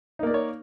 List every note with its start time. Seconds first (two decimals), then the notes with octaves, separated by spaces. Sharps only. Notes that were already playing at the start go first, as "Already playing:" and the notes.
0.19 D#4
0.23 A#3
0.27 D5
0.30 A#4
0.34 C#5